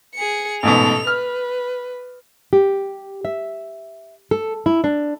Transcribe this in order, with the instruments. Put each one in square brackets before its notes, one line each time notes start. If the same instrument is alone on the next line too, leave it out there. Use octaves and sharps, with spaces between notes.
[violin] G#4 C#7
[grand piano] A1 G#2 B2 [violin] A4 F7
[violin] B4 [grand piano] F6
[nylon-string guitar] G4
E5
A4
E4
D4